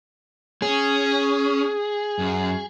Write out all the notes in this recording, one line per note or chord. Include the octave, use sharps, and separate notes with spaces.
C#4 G#4
F#2